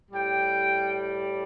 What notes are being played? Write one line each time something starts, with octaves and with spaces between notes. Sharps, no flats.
A2 G3 G5